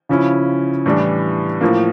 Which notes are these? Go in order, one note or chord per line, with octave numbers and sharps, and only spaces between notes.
C#3 F3 C#4 E4
A2 E3 G3 D4
A2 F3 A#3